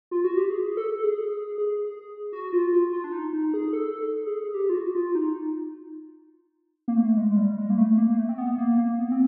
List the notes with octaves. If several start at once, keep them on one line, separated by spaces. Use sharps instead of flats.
F4
F#4
G4
G#4
A4
A4
G#4
G#4
G#4
G#4
F#4
F4
F4
F4
D4
D#4
D#4
G#4
A4
A4
G#4
G#4
G4
F4
F#4
F4
D#4
A#3
A3
G#3
G#3
G3
G#3
A#3
A3
A#3
A3
C4
B3
A#3
A#3
B3
C4